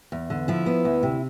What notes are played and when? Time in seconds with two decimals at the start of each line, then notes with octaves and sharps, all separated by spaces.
0.12 E2
0.30 D3
0.48 F3 E4
0.66 B3
0.85 D2
1.03 C3